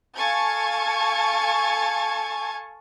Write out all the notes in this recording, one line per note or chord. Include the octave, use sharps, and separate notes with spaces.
A4 F5 G#5 A5 C#6 G#6